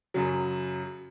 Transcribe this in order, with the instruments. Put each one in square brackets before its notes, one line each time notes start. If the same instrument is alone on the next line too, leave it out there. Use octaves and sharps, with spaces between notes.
[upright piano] F#2 C#3 F#3